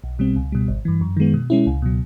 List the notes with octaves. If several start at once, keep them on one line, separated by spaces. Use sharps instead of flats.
B1
B2 G3 C4
C#2
B2 G3
G#1
G2 E3
F#2
D#3 G#3 B3
B2
G#3 C#4 E4
C#2
B2 F#3